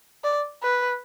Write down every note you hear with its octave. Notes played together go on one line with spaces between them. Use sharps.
D5
B4